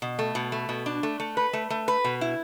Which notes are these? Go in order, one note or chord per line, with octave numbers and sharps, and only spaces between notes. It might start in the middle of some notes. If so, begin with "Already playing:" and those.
B2
A3
B2
A3
B2
D4
A3
A3
B4
A3
A3
B4
B2
E4